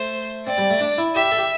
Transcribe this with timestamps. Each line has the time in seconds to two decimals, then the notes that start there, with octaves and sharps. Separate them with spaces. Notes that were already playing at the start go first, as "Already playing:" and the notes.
Already playing: A3 C5
0.47 C4 D5
0.58 G3
0.70 A3
0.81 D4
0.98 E4
1.15 G4 E5
1.32 A4
1.38 G4